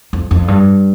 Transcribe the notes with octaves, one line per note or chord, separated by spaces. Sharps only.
F2
F2
G2